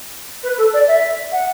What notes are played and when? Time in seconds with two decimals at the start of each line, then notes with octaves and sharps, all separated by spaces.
0.43 B4
0.57 A4
0.73 D5
0.88 E5
1.32 F#5